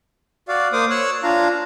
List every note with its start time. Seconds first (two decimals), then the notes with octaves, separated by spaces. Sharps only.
0.48 F#4 D5 F5
0.73 A#3 C5 D6 D#6
0.90 C#5 E6 F#6
1.23 D4 F4 F5 A#5